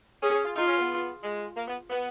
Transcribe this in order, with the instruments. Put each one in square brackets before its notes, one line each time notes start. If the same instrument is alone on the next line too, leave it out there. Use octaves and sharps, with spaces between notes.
[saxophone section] C#4 [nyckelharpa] G#4
[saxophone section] C#4
F4
[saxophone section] D#4 [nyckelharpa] F4
[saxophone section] C#4
B3
G#3
A#3
B3
B3